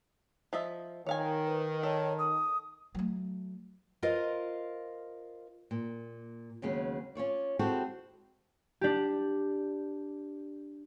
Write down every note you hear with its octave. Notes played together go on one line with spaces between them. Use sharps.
F3 D#5 E5
D#3 C#5 F5 G#5
B4
A4 C#5
D#6
F#3 A3
F4 A#4 C5 D#5 F5
A#2
D#2 C#3 F#3 G#3 B3 C#4
C#4 F4 C#5 D5
G#3 C4 E4 F#4 G4 A4
D4 G4